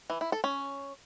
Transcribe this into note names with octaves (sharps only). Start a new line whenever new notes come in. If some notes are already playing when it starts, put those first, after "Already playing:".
E3
E4
A4
C#4